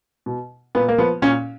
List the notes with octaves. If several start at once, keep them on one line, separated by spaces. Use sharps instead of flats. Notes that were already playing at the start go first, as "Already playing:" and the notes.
B2
A#2 B3
A#3
F3 B3
A#2 C#4